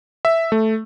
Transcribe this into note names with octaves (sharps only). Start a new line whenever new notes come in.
E5
A3